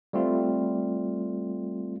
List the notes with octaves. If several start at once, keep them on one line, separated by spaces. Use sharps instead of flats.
G3 A3 C4 F4